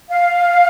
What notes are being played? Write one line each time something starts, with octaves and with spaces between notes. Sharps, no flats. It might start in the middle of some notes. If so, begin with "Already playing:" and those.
F5